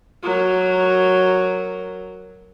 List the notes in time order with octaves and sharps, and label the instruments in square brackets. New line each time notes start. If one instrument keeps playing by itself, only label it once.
[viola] F#3 A#4